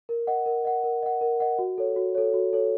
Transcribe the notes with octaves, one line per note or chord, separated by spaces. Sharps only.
A#4
D#5 F#5
A#4
D#5 F#5
A#4
D#5 F#5
A#4
D#5 F#5
F#4
A4 C#5
F#4
A4 C#5
F#4
A4 C#5